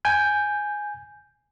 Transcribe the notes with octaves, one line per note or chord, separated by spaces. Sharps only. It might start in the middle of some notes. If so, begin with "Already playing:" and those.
G#5 G6